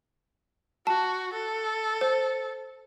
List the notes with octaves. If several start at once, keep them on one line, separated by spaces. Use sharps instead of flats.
F#4 A5
A4
C5